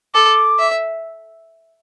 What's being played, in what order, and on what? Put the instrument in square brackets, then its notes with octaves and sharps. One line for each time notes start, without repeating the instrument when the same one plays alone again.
[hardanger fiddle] A4 [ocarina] D6
[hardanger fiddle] E5